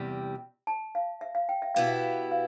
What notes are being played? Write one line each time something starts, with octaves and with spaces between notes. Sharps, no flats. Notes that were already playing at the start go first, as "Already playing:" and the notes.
Already playing: E2 C3 G3
A5
F5
E5
F5
G5
E5
B2 B3 E4 G4 F5
E5
F5